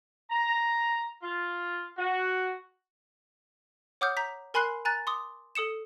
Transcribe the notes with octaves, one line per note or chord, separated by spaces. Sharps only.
A#5
F4
F#4
C#5 F#5 D6 D#6 F6 G6
A#5 G6 B6
A#4 G#5 B5 C6 F#6 C7
G#5 A#5 F#6 A6
C6 D6 D#6
A4 D#6 C#7 E7